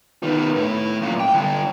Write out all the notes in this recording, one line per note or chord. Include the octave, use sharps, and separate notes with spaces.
D#3 B3
A2 E4
F#2 A#2
G5
D3 G3